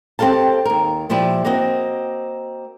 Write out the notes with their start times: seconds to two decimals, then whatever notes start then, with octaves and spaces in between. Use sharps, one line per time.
0.19 C4 G4 A4 F5 A5
0.65 D#2 A#4
1.10 A#2 F3 E4 G4 D5 E5
1.45 A#3 C4 F#4 D#5